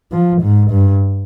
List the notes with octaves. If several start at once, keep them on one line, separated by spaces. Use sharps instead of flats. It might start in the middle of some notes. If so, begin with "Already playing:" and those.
F3
G#2
G2